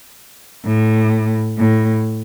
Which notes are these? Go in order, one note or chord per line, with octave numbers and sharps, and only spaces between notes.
A2
A2